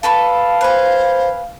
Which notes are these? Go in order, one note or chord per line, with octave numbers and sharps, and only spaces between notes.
A4 B4 F5 C#6
B4 C5 G#5